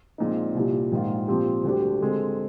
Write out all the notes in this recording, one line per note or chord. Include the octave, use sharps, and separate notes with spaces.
A#1 A#2 G#3 C4 D#4
C2 A#2 G3
A#1 G#2 D#3 A#3 F4
A#2 F3 C4 G4
D2 D3 G3 D4 G4
D3 G#3 C4